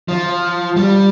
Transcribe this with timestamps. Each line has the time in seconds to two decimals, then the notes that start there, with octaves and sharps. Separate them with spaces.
0.08 F3
0.76 G3